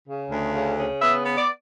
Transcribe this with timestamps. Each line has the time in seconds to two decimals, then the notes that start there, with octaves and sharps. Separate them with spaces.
0.08 C#3
0.31 D2
0.55 C#3
0.79 C#3
1.02 B3 E5
1.25 B3
1.38 D5